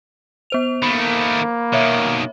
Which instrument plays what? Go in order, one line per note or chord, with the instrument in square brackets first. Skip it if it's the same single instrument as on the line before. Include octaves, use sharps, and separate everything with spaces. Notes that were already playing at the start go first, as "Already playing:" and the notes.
[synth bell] B3 C5 F7
[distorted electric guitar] D#3 A3 [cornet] A#3 [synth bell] B5
[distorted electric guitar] B2 D#3 [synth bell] C#5 E5